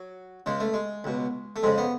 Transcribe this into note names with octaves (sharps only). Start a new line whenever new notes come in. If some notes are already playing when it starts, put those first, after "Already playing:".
Already playing: F#3
C#2 C#3 G#3
A3
G#3
C#2 B2
A3
F2 C#3 G#3
B3